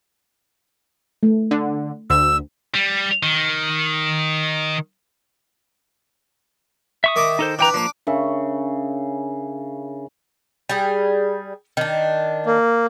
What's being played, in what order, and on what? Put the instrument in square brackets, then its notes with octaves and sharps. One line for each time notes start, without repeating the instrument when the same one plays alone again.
[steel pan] A3
[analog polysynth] D3
[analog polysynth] D2 [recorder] E6
[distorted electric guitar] G3
D#3
[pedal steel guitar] E5 C#6 D#6
[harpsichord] D#3 D#5 D6
[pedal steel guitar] D#4 A4 C5
[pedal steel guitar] E3 G5 A#5 [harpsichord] D4 B4
[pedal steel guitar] F3 A#3 [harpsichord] D4 D6
[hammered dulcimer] C#3 [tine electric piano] D4 A#4 E5
[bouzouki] G3 G#4
D#3 D4
[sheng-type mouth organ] A#3